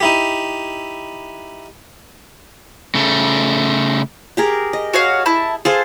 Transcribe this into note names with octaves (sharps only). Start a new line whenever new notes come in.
D#4 E4 G4
C#3 A3
G4 G#4 A#4
D#5
F#4 C#5 F5
E4 A5
F4 G#4 A4 C5